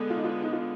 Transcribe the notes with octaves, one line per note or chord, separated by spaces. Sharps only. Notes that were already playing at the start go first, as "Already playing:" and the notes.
Already playing: D3 G#3 B3
F4
D#4
F4
D#4
F4